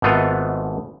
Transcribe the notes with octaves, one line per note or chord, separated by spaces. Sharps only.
G#1 G#2 A3 B3 F4